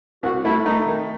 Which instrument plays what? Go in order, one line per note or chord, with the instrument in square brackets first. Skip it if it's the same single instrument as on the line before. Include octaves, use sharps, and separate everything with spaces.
[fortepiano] C2 [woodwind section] F#4
[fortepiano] A3 [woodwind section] E4
[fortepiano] A3 [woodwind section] D#4
[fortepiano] D#3